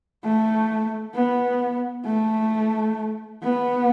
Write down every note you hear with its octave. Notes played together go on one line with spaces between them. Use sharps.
A3
B3
A3
B3